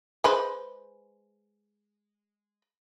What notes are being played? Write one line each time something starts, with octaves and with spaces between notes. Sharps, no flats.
G#3 B4 C5